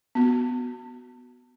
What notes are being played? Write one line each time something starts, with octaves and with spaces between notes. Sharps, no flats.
B3 F#4